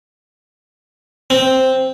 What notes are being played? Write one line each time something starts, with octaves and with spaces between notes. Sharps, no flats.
C4